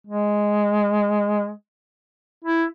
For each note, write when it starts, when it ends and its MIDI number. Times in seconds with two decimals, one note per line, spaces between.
0.07 1.51 56
2.44 2.64 64